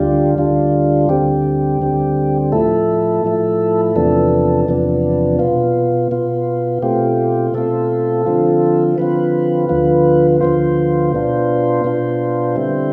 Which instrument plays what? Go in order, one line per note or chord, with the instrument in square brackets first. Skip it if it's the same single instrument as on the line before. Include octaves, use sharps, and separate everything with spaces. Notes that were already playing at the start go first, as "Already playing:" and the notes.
Already playing: [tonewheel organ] D2 D3 G3 D4 F4 G4
D2 D3 G3 D4 F4
D2 D3 G3 C4 G4
D2 D3 G3 C4
A2 F3 A3 E4 A4
A2 F3 A3 E4
E2 C3 F3 B3 D4 A4
E2 C3 F3 B3 D4
B2 B3 F4
B2 B3 F4
B2 A3 C4 F4 G4
B2 A3 C4 F4 A4
D3 F3 C4 F4
D3 F3 C4 F4 B4
D2 D3 F3 B3 F4
D2 D3 F3 B3 F4 C5
B2 B3 D4 F4
B2 B3 D4 F4
D3 G3 C4 E4